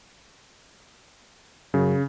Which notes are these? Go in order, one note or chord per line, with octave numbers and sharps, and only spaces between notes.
F#2 C#3